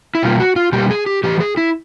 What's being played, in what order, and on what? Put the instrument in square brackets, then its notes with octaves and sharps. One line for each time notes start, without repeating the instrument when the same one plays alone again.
[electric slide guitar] E4
B2 G3 A#3 F4
F#4
F4
B2 G3 A#3 G4
G#4
G4
A2 E3 G3 G4
G#4
E4